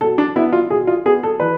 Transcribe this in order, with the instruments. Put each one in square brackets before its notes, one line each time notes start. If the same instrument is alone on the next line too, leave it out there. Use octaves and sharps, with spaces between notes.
[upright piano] B2 A4
D4
B3 E4
F4
B2 G#4
F4
B3 G#4
A4
E3 B4